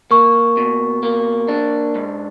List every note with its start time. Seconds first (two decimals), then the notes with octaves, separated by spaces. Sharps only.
0.11 A#3 C#6
0.57 B2
1.03 A#3
1.48 D4
1.95 G#2